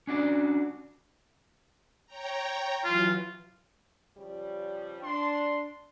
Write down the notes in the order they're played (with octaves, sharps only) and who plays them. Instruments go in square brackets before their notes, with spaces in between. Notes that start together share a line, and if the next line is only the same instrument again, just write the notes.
[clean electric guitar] C#4 D4 F#4 D5
[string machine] C#5 G5 A#5
[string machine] E3 F#3 [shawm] F4
[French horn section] C#3 F3 G3
[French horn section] D4 [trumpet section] C6